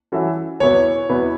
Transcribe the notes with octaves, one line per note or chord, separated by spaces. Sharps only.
E3 C#4 F#4 A4 E5
E2 B2 B3 E4 B4 C#5
E2 B2 B3 E4 B4